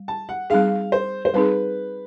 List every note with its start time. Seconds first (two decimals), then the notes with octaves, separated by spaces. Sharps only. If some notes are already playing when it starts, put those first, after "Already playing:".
Already playing: G3
0.08 A5
0.29 F#5
0.50 G3 C4 D#4 G#4 F5
0.92 C5
1.25 C5
1.34 G3 C4 D#4 G#4 B4